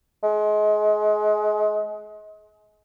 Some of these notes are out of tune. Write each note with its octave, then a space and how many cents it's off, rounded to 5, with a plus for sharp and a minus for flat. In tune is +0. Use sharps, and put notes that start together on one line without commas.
G#3 +30